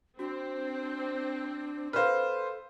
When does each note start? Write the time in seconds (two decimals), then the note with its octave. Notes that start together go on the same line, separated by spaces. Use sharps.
0.19 C4 D4 F#4
1.93 A4 B4 C5 F5 F6